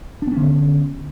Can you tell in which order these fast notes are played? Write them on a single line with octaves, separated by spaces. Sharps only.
D4 B3 C#4 D3